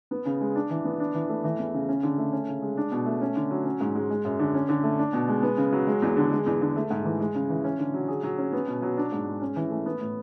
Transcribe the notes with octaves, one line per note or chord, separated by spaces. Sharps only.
B3
C#3
G#3
D4
E3
B3
D4
E3
A3
E3
E2
C#3
C#4
D3
A3
C#4
C#3
G#3
D4
B2
A3
C#4
D3
F#3
C#4
G#2
G#3
G#3
F#2
D3
C#4
D3
A3
D4
B2
G#3
B3
C#3
F#3
G#3
E2
D3
G#3
E2
D3
A3
G#2
E3
G#3
C#3
E3
C#4
D3
F#3
G#4
F#3
C#4
B3
B2
F#3
D4
G#2
G#3
C#4
E3
A3
B3
A2